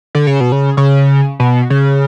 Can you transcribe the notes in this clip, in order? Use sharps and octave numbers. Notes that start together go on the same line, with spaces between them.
D3
C#3
B2
C#3
C#3
B2
C#3